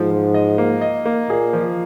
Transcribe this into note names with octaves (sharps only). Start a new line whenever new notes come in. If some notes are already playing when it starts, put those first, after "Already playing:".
Already playing: G#2 F3
F3
D#5
A#3
D#5
A#3
A#2 G#4
F3